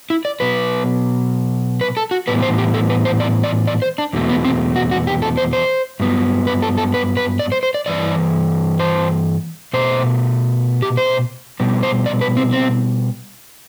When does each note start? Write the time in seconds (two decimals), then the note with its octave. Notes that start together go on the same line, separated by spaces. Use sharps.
0.10 E4
0.25 D5
0.40 B2 F#3 B3 B4
1.81 B4
1.97 A4
2.11 F#4
2.27 A2 E3 G3 B3 B4
2.42 C5
2.58 G4
2.74 A4
2.90 B4
3.05 C5
3.20 D5
3.44 D5
3.67 D5
3.82 C5
3.98 D4
4.13 E2 B2 F#3 A3
4.29 B3
4.45 C4
4.76 F#4
4.91 F#4
5.07 G4
5.22 A4
5.37 C5
5.53 C5
6.00 G2 F#3 B3
6.47 B4
6.62 A4
6.77 A4
6.94 B4
7.17 B4
7.39 D5
7.52 C5
7.63 C5
7.74 D5
7.86 G2 E3 D5
8.80 C5
9.73 B2 A3 C5
10.82 G4
10.97 C5
11.60 B2 G3 B3
11.83 C5
12.06 D5
12.21 B4
12.37 C4
12.53 C4